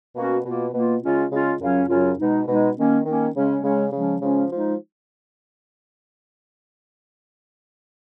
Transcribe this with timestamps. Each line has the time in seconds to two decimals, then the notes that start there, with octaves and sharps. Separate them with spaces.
0.16 B2 A#3 C#4 F#4
0.45 B2 A#3 F4
0.74 B2 A#3 F4
1.03 C#3 G#3 C#4 F4
1.31 C#3 G#3 C#4 F4
1.60 F#2 C#3 F#3 C#4 F4
1.89 F#2 C#3 F#3 C#4 F4
2.18 B2 G#3 D#4
2.47 B2 G#3 D#4
2.77 D#3 A#3 C#4
3.05 D#3 A#3 C#4
3.35 C#3 G#3 C#4
3.63 C#3 G#3 C#4
3.92 C#3 F3 G#3 C#4
4.22 C#3 F3 G#3 C#4
4.51 F3 G#3 D#4